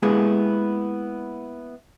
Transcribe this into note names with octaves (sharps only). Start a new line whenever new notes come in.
G#3 A#3 B3 E4 G4 G#4